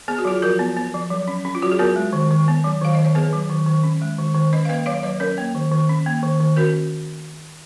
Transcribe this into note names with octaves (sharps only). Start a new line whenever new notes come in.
B3 G#4
F#4
F#3 F4 G#4
F3 F#4 A#4
B3
B3
F3
F#3
C#4
C#4
F4
F#3 F#4
G#4
B3 F#4 A#4
G#3
D#3
D#3
B3
F#3
D#3 F5
D#3 D#5
C#5
B3 G#4 B4
F#3
D#3
D#3
C#4
G#3
D#3
D#3
C#4 B4 D#5
F5
A#3 B4 D#5
F#3 C#5 F5
F#3 B4 D#5
C#4 A#4 C#5
A#3
D#3
D#3
C#4
A#3
D#3
D#3
C#4 F#4 A#4